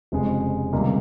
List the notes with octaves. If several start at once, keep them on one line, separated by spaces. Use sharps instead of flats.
F1 F2 C#3 G#3
C#2 C3 D#3 G3 A#3